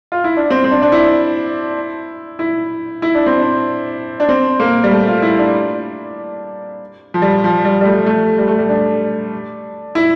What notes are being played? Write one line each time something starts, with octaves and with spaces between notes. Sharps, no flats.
F4
E4
D4
C4
C4
D4
D4
E4
E4
E4
D4
C4
D4
D4
C4
A#3
G3
A3
F4
E4
D4
F3
G3
F3
G3
G3
A3
A3
G3
A3
G3
D4
E4